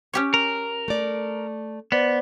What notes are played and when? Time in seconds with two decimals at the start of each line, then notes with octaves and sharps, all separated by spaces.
0.13 C#4 G4 C#5
0.34 A#4
0.88 A3 D5
1.92 B3 C5 D5